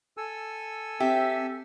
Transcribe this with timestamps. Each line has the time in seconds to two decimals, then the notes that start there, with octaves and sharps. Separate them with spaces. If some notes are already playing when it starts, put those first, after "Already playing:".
0.17 A4 G#5 E6
1.00 C4 G4 E5